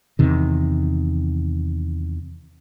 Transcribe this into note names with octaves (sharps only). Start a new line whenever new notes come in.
E2 C3 D#3